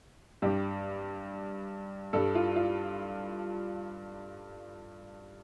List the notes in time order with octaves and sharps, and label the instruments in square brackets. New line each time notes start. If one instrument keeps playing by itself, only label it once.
[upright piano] G2 G3 G4
G2 G3 A4
F4
F4